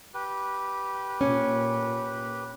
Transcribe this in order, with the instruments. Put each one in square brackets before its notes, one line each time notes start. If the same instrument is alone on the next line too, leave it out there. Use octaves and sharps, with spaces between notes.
[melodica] G4 B4
[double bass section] A#2 [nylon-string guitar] C#4